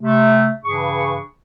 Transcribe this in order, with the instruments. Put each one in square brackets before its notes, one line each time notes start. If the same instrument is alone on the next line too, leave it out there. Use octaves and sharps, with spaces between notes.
[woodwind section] C3 A3
G2 C#3 E3 D4 G#4 C#6